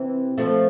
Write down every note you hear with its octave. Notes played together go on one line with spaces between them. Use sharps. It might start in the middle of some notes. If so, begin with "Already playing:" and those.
Already playing: C3 E3
F3 A3